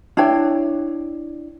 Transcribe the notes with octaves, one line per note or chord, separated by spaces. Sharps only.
D4 E4 C#5 G5